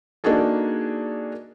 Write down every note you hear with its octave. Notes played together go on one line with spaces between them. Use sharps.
A#3 D4 D#4 F#4 G#4 A4